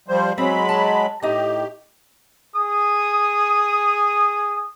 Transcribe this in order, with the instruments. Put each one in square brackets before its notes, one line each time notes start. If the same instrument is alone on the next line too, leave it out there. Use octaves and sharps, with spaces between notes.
[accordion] F3 G3 C5
[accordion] F#3 G#3 B5 [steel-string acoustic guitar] C4
[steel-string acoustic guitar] A5
[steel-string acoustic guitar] A2 D#4 [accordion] G4
[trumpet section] G#4 D#6